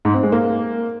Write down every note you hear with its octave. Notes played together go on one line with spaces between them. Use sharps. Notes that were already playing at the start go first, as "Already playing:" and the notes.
G#2
C4
G#3
A#3